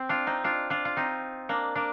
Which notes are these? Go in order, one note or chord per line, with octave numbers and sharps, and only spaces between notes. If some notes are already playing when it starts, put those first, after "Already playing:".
Already playing: C4
D4 F4
C4 D#4
D4 F4
D4 F4
F4
C4 D#4
A#3 D4
A#3 D4